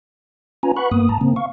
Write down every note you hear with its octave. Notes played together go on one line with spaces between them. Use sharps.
C#4 F4 B4 G#5 A#5
B4 F#5 B5 C#6 F#6
G2 A#3 B3 D#6
G#2 A5 A#5
C#3 A#3 C4
F5 C#6